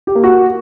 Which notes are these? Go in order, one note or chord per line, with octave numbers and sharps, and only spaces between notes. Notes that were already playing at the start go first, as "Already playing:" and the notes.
G4
A#3
F#4